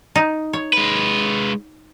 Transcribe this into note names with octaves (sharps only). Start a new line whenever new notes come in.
D#4
C#5
G#3 B4